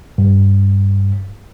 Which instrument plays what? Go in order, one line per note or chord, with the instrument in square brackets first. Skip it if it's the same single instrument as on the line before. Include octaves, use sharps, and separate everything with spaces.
[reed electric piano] G2